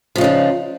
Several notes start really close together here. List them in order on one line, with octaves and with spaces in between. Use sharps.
F3 C#3 D#4 D4